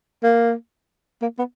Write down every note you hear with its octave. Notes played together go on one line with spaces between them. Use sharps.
A#3
A#3
B3